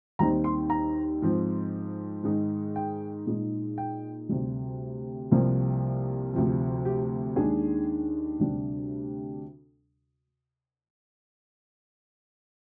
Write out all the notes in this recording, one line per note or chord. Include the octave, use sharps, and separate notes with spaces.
D#2 D#3 G3 C4 D#4 A#5
C6
A#5
G#2 F3 C4
G#2 D#3 G#3 D#4
G5
A#2 G#3 D#4
G5
D2 C3 G3
C2 C3 F3 A#3
D2 C3 F3
G4
D#2 D#3 G#3 D4 G#4
D2 C3 G3 D4